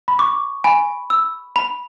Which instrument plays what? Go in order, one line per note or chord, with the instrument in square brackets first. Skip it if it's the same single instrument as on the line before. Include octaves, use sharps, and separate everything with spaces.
[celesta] B5
[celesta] C#6 [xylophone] D6
[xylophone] G#5 [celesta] B5
[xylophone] E6
B5